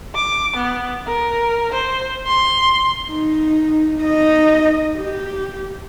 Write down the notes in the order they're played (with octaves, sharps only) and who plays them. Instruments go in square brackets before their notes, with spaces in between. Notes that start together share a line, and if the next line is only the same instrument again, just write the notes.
[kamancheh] D6
B3
A#4
C5
C6
[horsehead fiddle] D#4
D#4 D#5
G4